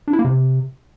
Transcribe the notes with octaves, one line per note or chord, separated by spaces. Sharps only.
D4
E4
A#3
C3